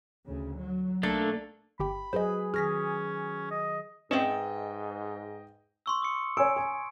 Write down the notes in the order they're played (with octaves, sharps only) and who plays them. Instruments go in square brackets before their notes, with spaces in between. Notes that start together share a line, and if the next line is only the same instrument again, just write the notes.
[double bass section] D2 C#3
F#3
[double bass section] B1 [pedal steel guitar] A3 A#3 D4 [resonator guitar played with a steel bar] A4
[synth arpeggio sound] G1 G4 G5 [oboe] B5
[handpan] F#3 G#4 B4 [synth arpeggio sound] C5 D#5
[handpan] D#3 G#4 [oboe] C#4 [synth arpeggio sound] F6 A#6 B6
[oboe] D#5
[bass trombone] G#2 [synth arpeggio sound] C4 C#4 [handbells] B4 E5 [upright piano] D#5 G5
[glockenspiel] C6 C#6 E6
D#6 C#7
[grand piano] C#5 G#5 E6 [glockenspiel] D7
[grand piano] G#5